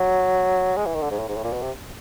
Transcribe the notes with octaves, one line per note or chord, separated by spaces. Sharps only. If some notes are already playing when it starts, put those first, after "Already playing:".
Already playing: F#3
G#3
E3
D#3
D3
G#2
A2
G#2
A2
A#2
B2
C3